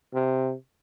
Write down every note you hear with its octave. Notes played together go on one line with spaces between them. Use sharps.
C3